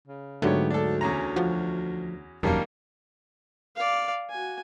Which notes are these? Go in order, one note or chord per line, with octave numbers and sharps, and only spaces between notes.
C#3
G#2 D3 F#3 A3 B3 G4 C#5
D2 D4 A4
E2 C#4 A#5
F3 F#4
E1 F#2 D#3 G3 A#3 D4
D5 F5
F#4 G#5